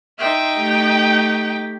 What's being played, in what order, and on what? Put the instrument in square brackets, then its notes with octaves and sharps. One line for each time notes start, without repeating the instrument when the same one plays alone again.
[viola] D#4 G5 [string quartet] E5 C6
[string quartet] A3 G4